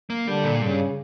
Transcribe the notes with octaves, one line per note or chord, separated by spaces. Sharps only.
A#3
D3 G3
A#2
G2 C#3